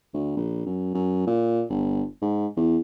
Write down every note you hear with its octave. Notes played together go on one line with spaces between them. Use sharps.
D2
A#1
F#2
F#2
A#2
G1
G#2
E2